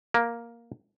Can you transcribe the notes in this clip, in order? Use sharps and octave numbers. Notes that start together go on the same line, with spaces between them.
A#3